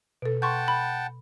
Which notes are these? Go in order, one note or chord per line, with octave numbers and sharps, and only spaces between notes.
B2 A4
F#5 G5 A5 C6 C#6 G6
B5